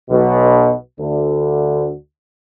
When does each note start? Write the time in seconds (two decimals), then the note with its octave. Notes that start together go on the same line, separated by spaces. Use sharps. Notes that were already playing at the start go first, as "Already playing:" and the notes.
0.10 B1 B2
0.99 D2 D3